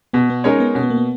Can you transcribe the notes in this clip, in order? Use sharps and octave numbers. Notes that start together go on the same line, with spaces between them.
B2 B3
B3
G#3 C#4 D#4 A#4 C#5
B3
B2 C#4
B3
A#3
B3